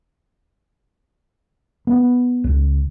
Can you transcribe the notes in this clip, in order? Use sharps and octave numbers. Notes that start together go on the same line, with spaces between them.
B3
C#2